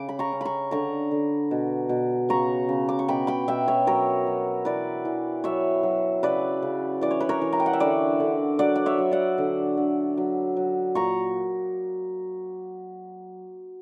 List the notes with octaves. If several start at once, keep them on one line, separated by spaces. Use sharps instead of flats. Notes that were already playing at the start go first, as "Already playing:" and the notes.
Already playing: C#3 D6
B5
A#5 C#6
C#4
A#5 B5 C#6
D3 A#5 C#6
D3
B2
B2
C#3 A#5 C#6
C#3
D6
C#6
B2 G5 B5
G5 B5
B2 E5 G5
C#5 E5
F#3 A#4 C#5
F#3
E3 B4 D5
E3
F#3 C#5 E5
F#3
C#3 B4 D5
C#3
E3 D5
C#5
B4
A#4 C#5
E3
A#5
G5
F#5
E5
D3 B4 D5
D3
F#3 D5 F#5
F#5
C#5 E5
F#3
D5 F#5
D3
D3
F#3
F#3
A#2 A#5 C#6